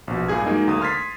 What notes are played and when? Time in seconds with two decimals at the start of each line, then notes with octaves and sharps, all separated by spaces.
0.08 A#1 B2
0.28 G2 A#2 G#4 G#6
0.46 F#3 G#3 A#3 D#4
0.68 D2 A#3 D#6
0.81 C6 F6 G#6 A6 B6 C7